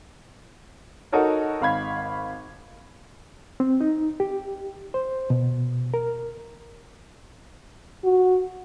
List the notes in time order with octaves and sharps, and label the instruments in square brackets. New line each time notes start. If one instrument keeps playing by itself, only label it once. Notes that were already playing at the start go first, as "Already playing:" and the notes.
[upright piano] D#4 F#4 A4 A#4 C#5
G#1 F5 B5 G#6
[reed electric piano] C4
D#4
G4
C5
B2
A#4
[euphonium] F#4